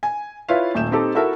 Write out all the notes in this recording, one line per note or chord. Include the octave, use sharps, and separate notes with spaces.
G#5
E4 F4 B4 C#5 E5 F5
D#1 A3 E5 G6 E7
C4 D#4 G4 A4
E4 F#4 A4 A#4 E5